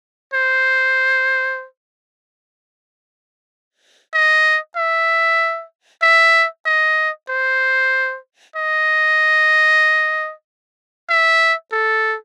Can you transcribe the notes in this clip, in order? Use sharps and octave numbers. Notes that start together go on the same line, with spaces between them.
C5
D#5
E5
E5
D#5
C5
D#5
E5
A4